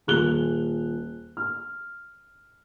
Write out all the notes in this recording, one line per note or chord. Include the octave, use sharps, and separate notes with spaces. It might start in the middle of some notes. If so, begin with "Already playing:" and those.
D#1 G#4 F#6 F7 G7
F6